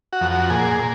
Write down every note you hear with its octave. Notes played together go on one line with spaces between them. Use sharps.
F#4
F2
F#4
A#2 G#4
A#2